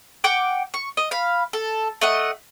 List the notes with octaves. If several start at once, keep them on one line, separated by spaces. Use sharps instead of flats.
F#5 G5 D6
C#6
D#5
F5 B5
A4
A3 D#5 F#5